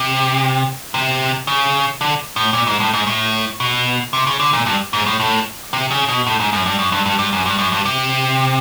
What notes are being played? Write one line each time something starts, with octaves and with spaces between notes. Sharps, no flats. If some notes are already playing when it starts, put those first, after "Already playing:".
Already playing: C3
C3
C#3
D3
A2
A#2
G#2
A2
G#2
A2
B2
C3
C#3
D3
A#2
G2
G#2
A2
A2
C3
C#3
B2
A2
G#2
F#2
G2
F#2
G2
G2
G2
F#2
G2
F#2
G2
C3